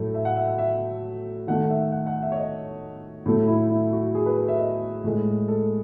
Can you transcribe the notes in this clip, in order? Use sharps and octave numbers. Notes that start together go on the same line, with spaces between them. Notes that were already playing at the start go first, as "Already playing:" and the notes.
Already playing: A2 F#3 A3
E5
F#5
E5
F#5
E5
D#3 A3 F#5
F#5
E5
F#5
F#5
E5
C#5
D#5
A2 F#3 A3 E4
E4
E4
F#4
G#4
B4
E5
D#5
A2 G#3
A4